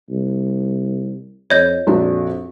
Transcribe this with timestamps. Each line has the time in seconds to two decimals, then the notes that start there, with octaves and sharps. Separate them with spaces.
0.10 C2
1.50 F2 C#5 D#5 G6
1.87 A#1 F2 D4 F#4